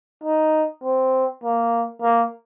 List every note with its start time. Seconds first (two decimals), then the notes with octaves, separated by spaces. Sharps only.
0.24 D#4
0.83 C4
1.44 A#3
2.02 A#3